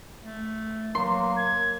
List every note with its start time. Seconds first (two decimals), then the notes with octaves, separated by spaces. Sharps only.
0.23 A3
0.95 F#3 A#3 C6
1.37 G#6